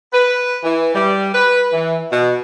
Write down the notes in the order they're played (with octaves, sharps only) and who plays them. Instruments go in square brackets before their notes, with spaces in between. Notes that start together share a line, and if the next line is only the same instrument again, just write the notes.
[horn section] B4
E3
G3
B4
E3
B2